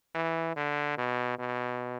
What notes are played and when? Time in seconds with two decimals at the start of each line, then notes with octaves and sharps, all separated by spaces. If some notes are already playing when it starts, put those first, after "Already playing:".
0.15 E3
0.56 D3
0.98 B2
1.39 B2